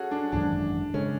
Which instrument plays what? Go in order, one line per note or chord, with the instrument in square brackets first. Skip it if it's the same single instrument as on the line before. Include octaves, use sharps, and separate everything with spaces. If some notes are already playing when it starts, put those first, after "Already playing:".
Already playing: [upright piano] C#4 F#4 G#4 A4
D4
[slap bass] G#1 F#2 E3 [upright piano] D4
[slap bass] C#3 G#3 [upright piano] C#4